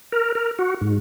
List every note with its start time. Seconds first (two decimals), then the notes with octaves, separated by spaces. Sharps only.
0.12 A#4
0.35 A#4
0.59 F#4
0.81 G#2